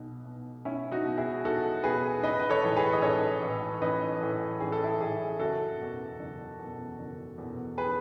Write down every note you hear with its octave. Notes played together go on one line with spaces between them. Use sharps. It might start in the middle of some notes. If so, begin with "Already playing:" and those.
Already playing: B1 B2
B2
B1 C#4 E4
D#4 F#4
B2
E4 G#4
B1 F#4 A4
B2 G#4 B4
A1 B4 D#5
B4
A4 C#5
A2 E3
G#4 B4
D#5
A1 A4 C#5
A2 E3
A1 B4 D#5
A2 E3
A1 G#4
A4
E4 G#4
A2 E3 E4 G#4
F#1 F#4 A4
E2 B2
F#1
E2
B2
F#1
E2 B2
G#4 B4